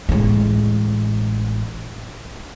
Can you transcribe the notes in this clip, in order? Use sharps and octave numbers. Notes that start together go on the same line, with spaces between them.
A1 G#3